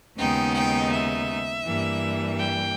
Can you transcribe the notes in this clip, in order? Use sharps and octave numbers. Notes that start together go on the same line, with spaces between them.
D#2 C#3 G#3 B3 D#4 G5
G5
E5
G2 E3 G3 A#3
G5